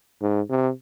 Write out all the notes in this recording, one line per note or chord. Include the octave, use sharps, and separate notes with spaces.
G#2
C3